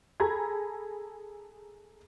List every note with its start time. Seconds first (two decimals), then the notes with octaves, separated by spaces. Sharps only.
0.20 G#4 A4 A#5 B5 G#6